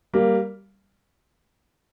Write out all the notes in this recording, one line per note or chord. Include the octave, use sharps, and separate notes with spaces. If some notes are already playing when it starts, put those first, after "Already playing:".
G3 A#3